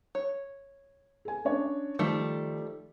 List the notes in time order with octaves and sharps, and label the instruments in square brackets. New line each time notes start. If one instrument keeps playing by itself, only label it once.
[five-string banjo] C#5
[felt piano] A4 G#5
C#4 D4 C#5
[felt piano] D#3 [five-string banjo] F3 G3 A3